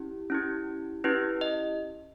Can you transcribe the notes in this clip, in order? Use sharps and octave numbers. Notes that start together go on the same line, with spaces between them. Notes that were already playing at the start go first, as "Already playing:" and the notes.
Already playing: C#4 E4 G4
C#4 E4 G4
C#4 E4 G4 B4
D#5